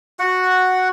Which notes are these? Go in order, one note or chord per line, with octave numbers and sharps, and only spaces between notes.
F#4 F#5